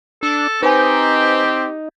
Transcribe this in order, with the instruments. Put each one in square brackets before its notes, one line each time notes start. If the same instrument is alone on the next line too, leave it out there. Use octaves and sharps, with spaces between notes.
[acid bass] D4 [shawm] A4
[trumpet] C4 [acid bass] D#4 [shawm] G4 [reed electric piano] B4 C5 G#5